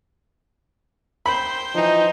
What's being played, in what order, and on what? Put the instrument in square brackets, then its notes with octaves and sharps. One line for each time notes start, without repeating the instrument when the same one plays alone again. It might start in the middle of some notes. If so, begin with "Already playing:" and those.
[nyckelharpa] C5 G5 [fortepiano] B5
[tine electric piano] E3 F3 [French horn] D#4